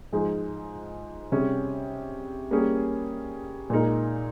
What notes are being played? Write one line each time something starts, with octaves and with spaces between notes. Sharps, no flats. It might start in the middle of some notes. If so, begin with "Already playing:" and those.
G#2 F3 G#3
C3 G3 C#4 G#4
G3 A#3 C#4 G#4
A#2 G#3 D#4 A#4